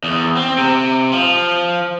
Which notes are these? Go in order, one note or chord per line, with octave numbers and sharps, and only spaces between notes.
E2
C4
C3
F3